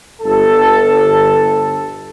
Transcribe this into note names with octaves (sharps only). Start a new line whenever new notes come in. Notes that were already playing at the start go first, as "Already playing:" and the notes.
G1 A4